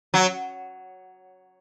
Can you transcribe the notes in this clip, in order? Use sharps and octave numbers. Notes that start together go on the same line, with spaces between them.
F#3